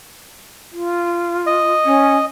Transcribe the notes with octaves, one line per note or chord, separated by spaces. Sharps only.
F4
D#5
C#4